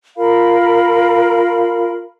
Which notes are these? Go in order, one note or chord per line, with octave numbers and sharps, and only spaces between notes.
F4 A#4 F5 B5